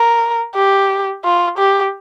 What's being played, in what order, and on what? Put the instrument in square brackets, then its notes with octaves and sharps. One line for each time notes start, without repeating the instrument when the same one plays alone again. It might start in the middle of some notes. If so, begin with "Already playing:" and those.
Already playing: [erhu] A#4
G4
F4
G4